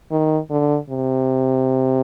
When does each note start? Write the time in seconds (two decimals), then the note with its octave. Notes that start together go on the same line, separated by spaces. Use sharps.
0.11 D#3
0.51 D3
0.89 C3